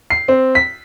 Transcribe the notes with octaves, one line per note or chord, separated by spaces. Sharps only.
C7
C4
B6